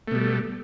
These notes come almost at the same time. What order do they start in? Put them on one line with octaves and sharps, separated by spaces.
A3 B2 G3